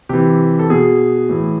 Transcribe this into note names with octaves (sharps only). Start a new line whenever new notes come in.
C3 E3 G4
A4
B2 G#4
A2 E3